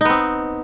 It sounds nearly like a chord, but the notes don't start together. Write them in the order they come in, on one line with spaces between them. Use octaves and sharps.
D#4 B3 C4